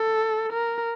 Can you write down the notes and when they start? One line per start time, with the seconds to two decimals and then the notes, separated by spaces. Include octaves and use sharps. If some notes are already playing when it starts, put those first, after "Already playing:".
Already playing: A4
0.52 A#4